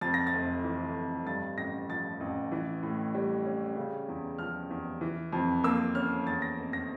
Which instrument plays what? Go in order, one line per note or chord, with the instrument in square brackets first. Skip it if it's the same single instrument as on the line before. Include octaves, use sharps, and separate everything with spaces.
[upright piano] F2 A6
A#6
A6
F1
E3
F1
G2 A6
A1 A#6
F3 A6
A1
E3
A2
G3
C#4
C#3
E2
F3 F6
E2
E3
F2
A#3 E6
C#4 F6
E2 A6
A#6
F1
A#6